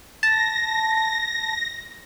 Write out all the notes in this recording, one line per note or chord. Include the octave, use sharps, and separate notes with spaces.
A5 A#6